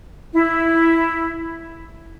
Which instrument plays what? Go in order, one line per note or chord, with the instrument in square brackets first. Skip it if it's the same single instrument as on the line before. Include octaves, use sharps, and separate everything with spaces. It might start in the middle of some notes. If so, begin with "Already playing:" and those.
[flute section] E4